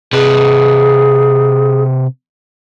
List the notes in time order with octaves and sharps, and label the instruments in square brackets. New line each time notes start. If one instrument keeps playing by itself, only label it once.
[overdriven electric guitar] C3 B4 [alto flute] G#4